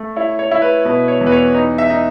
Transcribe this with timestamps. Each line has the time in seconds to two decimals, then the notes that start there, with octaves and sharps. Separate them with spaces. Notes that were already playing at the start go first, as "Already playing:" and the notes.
Already playing: A3
0.16 E4 C#5
0.39 C#5
0.51 E4
0.62 B4
0.85 B2 B4
1.08 C#5
1.21 E2
1.26 B4
1.32 C#5
1.54 D#4
1.78 E5
1.90 D#4